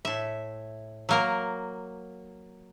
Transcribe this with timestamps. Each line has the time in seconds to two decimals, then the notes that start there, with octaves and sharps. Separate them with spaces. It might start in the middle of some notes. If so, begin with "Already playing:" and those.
0.05 A2 E5
1.09 F#3 A#3 A#4